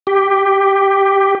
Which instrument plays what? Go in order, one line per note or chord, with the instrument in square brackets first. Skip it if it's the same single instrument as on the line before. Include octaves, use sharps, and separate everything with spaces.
[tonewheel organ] G4